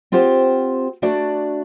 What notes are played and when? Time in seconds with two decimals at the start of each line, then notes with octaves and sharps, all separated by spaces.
0.12 C4 F4 G4 C5 F#5
1.02 A3 D4 F#4 D5